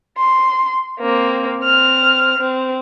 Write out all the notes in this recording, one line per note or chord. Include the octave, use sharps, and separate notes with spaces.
C6
A#3 C4
C4 F6
C4